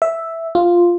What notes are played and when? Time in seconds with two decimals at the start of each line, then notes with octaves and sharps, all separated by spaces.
0.02 E5
0.55 F4